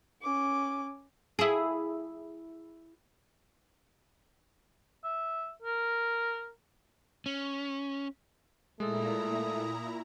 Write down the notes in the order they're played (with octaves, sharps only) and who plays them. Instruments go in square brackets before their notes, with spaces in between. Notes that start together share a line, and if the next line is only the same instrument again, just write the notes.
[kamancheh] C#4 D6
[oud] E4 G#4
[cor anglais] E5
A#4
[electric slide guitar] C#4
[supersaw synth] A#2 E4 A#5 [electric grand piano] G#3 A4 [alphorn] A3 [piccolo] D#6